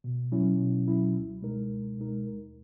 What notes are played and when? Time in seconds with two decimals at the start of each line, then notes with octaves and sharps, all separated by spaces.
0.04 B2
0.32 F#3 C#4 E4
0.59 B2
0.88 F#3 C#4 E4
1.15 C#2
1.42 B2 G#3 D#4 A#4
1.70 C#2
1.97 B2 G#3 D#4 A#4
2.25 D#2